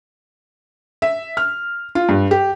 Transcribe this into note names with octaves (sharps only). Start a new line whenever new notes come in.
E5
F6
F4
G2
G4